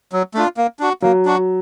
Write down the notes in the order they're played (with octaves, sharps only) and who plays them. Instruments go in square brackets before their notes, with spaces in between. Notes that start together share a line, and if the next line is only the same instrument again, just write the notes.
[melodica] F#3
A3 D4 F4
A#3
D4 F#4
[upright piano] F#3 [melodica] A#3
[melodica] D4 F#4